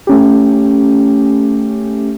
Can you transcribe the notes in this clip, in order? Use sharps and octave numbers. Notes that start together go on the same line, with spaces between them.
A3 C#4 G4